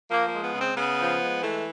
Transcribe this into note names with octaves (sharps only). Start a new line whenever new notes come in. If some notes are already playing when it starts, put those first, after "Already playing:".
F3 A#3
A#3
G#3
B3
C#3
C4
C#3 B3
F3
G#3
E3 A3